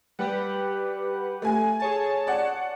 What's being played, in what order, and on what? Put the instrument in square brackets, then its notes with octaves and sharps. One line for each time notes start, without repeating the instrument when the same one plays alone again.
[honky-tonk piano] G3 [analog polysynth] G4 B4 F#5
[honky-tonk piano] A3 G#5
[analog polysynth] G#4 C#5 A5
[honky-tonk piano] D5 F#5